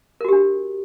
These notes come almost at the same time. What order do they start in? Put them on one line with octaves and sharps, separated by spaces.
A#4 F#4 G4 D4